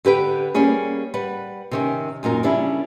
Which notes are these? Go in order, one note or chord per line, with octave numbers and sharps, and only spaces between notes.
D3 G4 B4 G5
G3 A#3 C#4 G#4
G3 B4 F#5
C3 D#3 C#4
F#2 A#2 D#4 A#4
C#3 G3 C#4 D4 E4